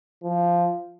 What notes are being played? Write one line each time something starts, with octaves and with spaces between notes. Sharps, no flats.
F3